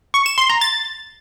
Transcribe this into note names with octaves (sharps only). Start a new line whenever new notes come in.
C#6
E7
C6
A#5
A6